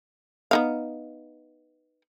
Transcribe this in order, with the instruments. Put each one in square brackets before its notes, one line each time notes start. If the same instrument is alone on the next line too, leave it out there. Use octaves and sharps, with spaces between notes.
[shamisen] B3 D#4 F5